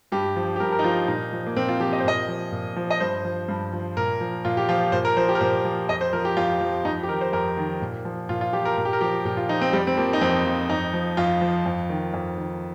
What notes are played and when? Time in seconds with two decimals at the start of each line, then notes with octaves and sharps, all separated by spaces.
0.12 G2 G4
0.36 F3
0.56 G4
0.60 G2 A#4
0.72 A#4
0.79 D#4
0.84 F3 F4
1.08 A#2 D#4
1.33 F3
1.47 A#3
1.56 A#2 C4
1.69 F4
1.80 F3 G4
1.93 D#5
2.00 C5
2.05 A#2 D#5
2.28 F3
2.52 A#2
2.76 F3
2.90 D#5
3.00 G2 C5
3.25 F3
3.48 G2
3.73 F3
3.97 A#2 A#4
4.20 F3
4.45 A#2 F4
4.57 G4
4.69 F3 F4
4.92 A#2 C5
5.05 A#4
5.17 F3 C5
5.29 G4
5.35 A#4
5.41 A#2 C5
5.65 F3
5.89 F2 D#5
6.01 C5
6.13 F3 A#4
6.25 G4
6.37 F2 F4
6.61 F3
6.85 F2 D#4
7.03 G4
7.09 D#3 A#4
7.21 C5
7.33 F2 A#4
7.57 D#3
7.81 A#2
8.05 F3
8.29 A#2 F4
8.41 F4
8.53 F3 G4
8.65 A#4
8.77 A#2 A#4
8.85 G4
8.93 A#4
9.01 F3 G4
9.25 A#2 G4
9.37 F4
9.49 F3 D#4
9.61 C4
9.73 F2 G3
9.87 C4
9.97 F3 A#3
10.13 D#4
10.21 F2 C4
10.46 F3
10.69 F2 D#4
10.93 F3
11.17 F2 F4
11.41 F3
11.66 F2
11.89 D#3
12.14 F2
12.38 D#3